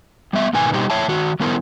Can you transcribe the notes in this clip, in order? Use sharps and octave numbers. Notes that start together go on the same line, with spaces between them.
G3 B3 E5
G#2 B2 D#3 B3 G#5
B2 G3 D#4 G4 C5
F2 C#5 E5 A5
D#3 F#4
D#3 G3 B3 E4 A#4 C5